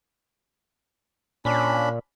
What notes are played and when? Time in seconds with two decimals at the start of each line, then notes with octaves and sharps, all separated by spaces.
1.45 A#2 C#4 D4 B5